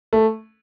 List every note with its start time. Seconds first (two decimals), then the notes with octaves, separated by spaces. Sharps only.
0.13 A3